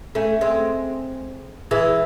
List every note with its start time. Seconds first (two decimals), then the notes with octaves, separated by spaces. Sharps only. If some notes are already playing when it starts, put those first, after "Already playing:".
0.15 A3 C#4
0.41 G#3 C4
1.71 E3 G#3